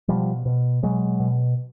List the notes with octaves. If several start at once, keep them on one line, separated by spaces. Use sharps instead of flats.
B2 F3 G3
B2
B2 F#3 G#3
B2